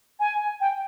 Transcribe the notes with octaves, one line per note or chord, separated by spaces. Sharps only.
G#5
G5